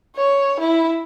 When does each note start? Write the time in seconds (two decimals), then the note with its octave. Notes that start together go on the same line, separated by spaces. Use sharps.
0.16 C#5
0.60 E4